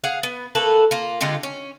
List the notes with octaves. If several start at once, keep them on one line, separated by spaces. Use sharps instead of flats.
G#4 F5 F#5
B3
A3 A#3 A4 B4
A#3 F4
D3 G#3 F4 G4
C#4